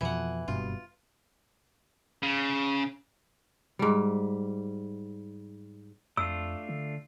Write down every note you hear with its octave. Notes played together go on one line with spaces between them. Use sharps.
F2 B2 E3 F#5
F#1 G2 B2 F4
C#3
G#2 G3
F2 A3 D4 F4 E6
D3